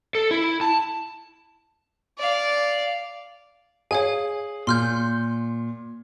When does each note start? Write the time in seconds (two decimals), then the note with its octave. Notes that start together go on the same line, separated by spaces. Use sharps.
0.15 A4
0.31 E4
0.61 A5
2.18 D5 F5
3.91 G#4 C#5 F5 G#5
4.67 A#2 C6 F6 G6